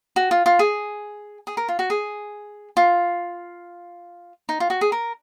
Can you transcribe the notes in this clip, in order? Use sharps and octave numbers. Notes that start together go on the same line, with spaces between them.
F#4
F4
F4
G#4
G#4
A#4
F4
F#4
G#4
F4
D#4
F4
F#4
G#4
A#4